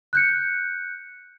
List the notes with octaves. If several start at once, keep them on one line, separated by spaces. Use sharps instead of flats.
F#6 G6 C#7